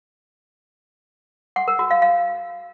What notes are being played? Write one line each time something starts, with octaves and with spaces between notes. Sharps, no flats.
F#5
A#4
F#4
F5
F5